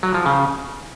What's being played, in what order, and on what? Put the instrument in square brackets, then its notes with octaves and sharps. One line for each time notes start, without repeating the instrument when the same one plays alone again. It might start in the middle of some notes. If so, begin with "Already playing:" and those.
[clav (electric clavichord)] F#3
F3
C#3